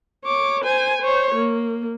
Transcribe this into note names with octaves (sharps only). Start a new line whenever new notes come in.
C#5 D6
C5 G#5
C5 C#5
A#3